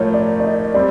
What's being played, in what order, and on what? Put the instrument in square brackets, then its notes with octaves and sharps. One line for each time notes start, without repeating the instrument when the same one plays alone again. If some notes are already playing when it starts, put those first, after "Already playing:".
Already playing: [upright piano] A2 F3 A3 [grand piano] A#4 C#5
[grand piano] D5
D5
D#5
[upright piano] G3 C4 [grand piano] D5